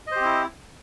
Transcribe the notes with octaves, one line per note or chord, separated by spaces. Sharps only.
C4 E4 G4 C5 D#5